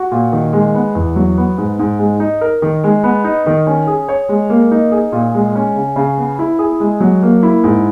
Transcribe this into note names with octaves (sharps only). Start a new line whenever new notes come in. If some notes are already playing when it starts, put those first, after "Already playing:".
Already playing: F#4
A#2
D#3
G#3
B3
E2
F#3
B3
G#2
G#2
G#3
D#4
A#4
D#3
G#3
B3
D#4
D#3
C#4
G#4
C#5
G#3
A#3
D#4
G#4
A#2
G#3
C#4
C#3
C#3
B3
E4
G#4
G#3
F#3
A#3
E4
G#2